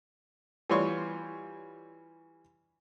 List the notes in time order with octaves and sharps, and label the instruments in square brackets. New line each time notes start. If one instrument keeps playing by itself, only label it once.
[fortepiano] E3 G3 F4 C#5 C6 C#6